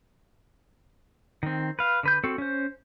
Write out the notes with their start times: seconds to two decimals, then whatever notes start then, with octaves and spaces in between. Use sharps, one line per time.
1.43 D#3 C4
1.79 B4 F5
2.03 D3 B4 G6
2.24 C4 F#4 A4
2.38 C#4 C5